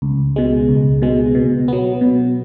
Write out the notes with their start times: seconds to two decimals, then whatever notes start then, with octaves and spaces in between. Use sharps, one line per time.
0.02 C#2
0.36 B2 G#3
0.69 C#2
1.02 B2 G#3
1.35 B2
1.68 F#3 B3
2.01 B2